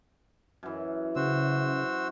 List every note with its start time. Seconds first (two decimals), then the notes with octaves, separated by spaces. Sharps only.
0.63 F#2 E3
1.16 C#3 F#4 C5 E6